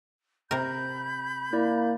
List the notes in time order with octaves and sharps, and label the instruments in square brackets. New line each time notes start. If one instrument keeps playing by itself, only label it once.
[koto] C3 A#4 [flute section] B5 G6
[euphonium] A#3 [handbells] E4 D5